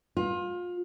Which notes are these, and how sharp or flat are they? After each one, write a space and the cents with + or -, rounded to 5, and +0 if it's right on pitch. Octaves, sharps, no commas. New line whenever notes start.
F4 +25